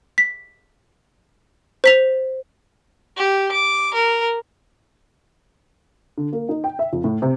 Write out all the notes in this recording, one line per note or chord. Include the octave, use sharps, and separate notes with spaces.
B6
C5 B6 F7
G4
D6
A#4
D3
A#3
D#4
G5
E5
F2
A2
C3